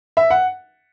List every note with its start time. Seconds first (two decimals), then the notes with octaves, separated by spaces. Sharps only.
0.17 E5
0.30 F#5